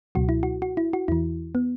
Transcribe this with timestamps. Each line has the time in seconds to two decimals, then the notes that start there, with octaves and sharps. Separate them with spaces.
0.15 C#2 B2 F#3 F#4
0.29 E4
0.43 F#4
0.62 F#4
0.77 E4
0.93 F#4
1.08 E2 E3 E4
1.55 B3